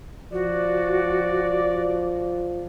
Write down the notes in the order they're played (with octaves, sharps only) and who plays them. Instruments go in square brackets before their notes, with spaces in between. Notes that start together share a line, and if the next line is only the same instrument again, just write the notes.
[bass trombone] F3 [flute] F#4 [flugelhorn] D5